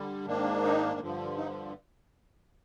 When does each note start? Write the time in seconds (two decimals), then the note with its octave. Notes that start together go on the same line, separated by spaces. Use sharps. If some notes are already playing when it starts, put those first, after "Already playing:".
Already playing: D3 G3
0.25 G#2 D#3 A#3 D4
0.62 D#4
1.00 G2 D3 F3
1.36 D#4